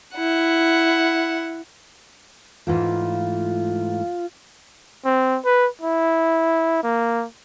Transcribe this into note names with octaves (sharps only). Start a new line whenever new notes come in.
E4 F#5
G#2 E3 A3 F4
C4
B4
E4
A#3